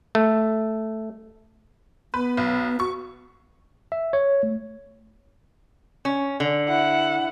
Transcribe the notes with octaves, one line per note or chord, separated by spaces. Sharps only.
A3
B3 B4
B1
F#4 C#6
E5
C#5
A3
C#4
D3
E4 F#5